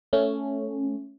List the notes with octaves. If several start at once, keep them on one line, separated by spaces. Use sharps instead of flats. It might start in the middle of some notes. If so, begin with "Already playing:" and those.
A3 C#4